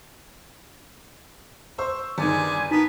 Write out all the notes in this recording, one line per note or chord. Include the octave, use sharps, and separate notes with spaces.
C5 C#6 E6
G1 D#3 G#4 D5 G#5
B3 D#4 A#4 B6